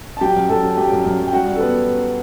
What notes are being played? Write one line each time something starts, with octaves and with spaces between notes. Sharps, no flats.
A5
F#3 G4 G5
F#2
F#2 A4 A5
F#3
A5
F#3 G4 G5
F#2
F#2
F#2
G5
G3 F#4 F#5
G3
A4
B3 B4